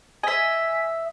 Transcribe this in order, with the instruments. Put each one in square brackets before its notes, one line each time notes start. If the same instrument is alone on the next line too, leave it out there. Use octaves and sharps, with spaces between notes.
[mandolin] D#5 E5 [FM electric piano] G#5 B6